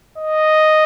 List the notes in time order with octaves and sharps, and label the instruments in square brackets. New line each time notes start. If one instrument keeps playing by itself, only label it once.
[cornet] D#5